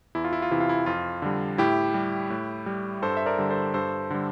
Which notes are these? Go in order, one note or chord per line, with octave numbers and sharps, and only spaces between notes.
E2 E4
F4
E4
F4
C3 E3 E4
F4
E4
F2 F4
D3 G3
A2 E4 G4
G3
A2
G3
G2 A4 C5
E5
A#4 D5
D3 G3
A4 C5
G2 A4 C5
D3 G3